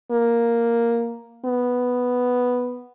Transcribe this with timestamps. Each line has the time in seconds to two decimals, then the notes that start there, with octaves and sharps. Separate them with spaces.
0.11 A#3
1.45 B3